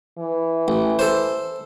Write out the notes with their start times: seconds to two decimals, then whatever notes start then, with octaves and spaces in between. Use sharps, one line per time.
0.18 E3
0.68 A1
0.99 A4 C5